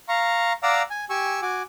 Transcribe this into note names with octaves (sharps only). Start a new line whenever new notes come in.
F5 A#5 C#6
D5 F5 F#5 A#5 D6 E6
G#5
G4 G#5 C#6 E6
F#4 G#5 D6